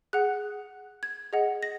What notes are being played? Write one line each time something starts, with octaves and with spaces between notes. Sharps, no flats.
G#4 F#5 F#6
G#6
G#4 D#5 F#5
A#6